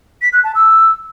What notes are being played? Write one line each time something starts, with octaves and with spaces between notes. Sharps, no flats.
B6
F#6
A5
E6